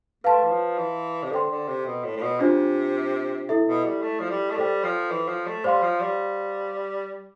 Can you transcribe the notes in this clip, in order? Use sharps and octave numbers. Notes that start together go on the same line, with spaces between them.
A3 B4 F5 A5 C6
E3
F3
E3
C3
D3 A4 C5 G5 C6
D3
C3
B2
A2
A2
B2
C3 D4 F4 C5
E4 A4 E5
B2
G3
A3
F3
G3
A3
G3 A4 C5 G5
F3
E3
F3
A3
G3 C5 F5 C6
F3
G3